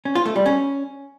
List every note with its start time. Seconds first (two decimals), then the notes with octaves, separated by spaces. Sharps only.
0.05 C#4
0.15 F4
0.26 A3
0.36 G3
0.46 C#4